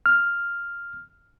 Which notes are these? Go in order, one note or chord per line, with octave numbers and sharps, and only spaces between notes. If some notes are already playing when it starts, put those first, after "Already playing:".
F6